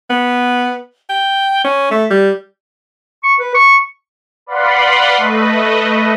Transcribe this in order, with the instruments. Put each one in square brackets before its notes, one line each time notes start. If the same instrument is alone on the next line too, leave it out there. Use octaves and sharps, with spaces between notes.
[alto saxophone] B3
G5
C#4
A3
G3
[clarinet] C#6
B4
C#6
[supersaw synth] B4 D5 F5 F#5 B5 C6
A3 B4 D#5